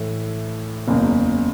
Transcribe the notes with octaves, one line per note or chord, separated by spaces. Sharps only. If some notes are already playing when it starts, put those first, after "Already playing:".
Already playing: A2 E3 A3
F#1 E2 C#3